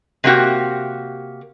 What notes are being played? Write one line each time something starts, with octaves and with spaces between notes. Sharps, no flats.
C3 A3 A#3 F#4 G4